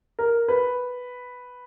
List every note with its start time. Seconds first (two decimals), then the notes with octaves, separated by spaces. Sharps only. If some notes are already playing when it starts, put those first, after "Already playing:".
0.19 A#4
0.48 B4